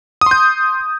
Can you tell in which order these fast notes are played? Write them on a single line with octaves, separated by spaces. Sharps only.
D#6 C6 G6